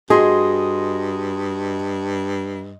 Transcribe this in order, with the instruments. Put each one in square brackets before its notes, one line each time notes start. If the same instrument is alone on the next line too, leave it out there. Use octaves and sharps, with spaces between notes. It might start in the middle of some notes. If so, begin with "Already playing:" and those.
[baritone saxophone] G2 [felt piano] F#4 [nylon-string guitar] G#4 [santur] D#5 C6